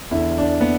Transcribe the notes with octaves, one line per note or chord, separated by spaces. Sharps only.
E2 D3 E4
D4
B3